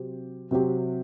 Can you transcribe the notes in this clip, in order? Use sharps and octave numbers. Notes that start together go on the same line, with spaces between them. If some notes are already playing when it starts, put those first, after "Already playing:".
Already playing: C3 F#3 C4 G4
C3 F#3 C4 G4